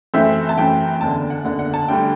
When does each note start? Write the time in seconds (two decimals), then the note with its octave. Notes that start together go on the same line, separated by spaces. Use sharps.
0.14 F#2 E3 A3 C4 E5
0.49 A5
0.58 F#2 E3 A3 C4 G5
1.01 F#1 E2 D3 A5
1.30 F#5
1.45 F#1 E2 D3 F#5
1.59 F#5
1.74 A5
1.88 D2 D3 G3 G5